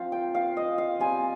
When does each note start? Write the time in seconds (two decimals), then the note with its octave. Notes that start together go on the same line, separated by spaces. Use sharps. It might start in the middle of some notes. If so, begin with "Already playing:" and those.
Already playing: F3 C4 F4 F5
0.12 G5
0.35 F5
0.57 D#5
0.78 F5
1.00 G3 C4 F4 G#5